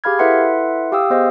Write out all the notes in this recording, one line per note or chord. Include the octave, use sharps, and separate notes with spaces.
G4 G#4 F5 B5 F6 G#6
E4 A4 B4 E5 F#5 C6
G4 F5 G5 D#6 E6
B3 G#4 C5 D#5 F5